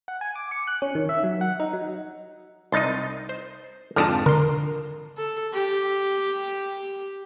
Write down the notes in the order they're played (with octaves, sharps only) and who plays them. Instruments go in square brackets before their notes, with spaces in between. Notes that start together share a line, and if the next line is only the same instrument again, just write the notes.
[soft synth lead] F#5
G#5
D6
C#7
F#6
C#4
D#3
E5
F#3
F#5
D#4
F#3
[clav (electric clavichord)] C2 D#4 D#5 [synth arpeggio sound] C6 A6
[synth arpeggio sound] C5
[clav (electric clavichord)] F2 G#2 D3 [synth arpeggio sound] A5 D#6 F6
[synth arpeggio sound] D3 C6 [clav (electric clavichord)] A#4
[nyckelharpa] A4
G4